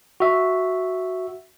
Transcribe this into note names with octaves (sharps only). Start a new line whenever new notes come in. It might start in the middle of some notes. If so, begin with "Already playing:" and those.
F#4 E5